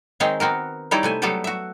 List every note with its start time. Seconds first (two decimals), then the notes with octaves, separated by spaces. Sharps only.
0.20 D#3 G#3 C4 D#4 C#5
0.40 B3 C4 F#4 A#4
0.91 G3 D#4 E4 C#5 D5
1.03 C3 A3 G#5
1.22 F#3 G3 A3 B3 G4 A4
1.44 F#4 E5